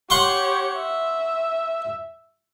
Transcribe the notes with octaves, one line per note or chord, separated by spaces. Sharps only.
G4 C#5 F#5 C6 C#6
E5